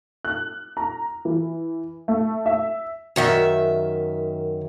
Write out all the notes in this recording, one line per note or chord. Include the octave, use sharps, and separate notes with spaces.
F#6
A#5
E3
A3
E5
F#2 D#3 E5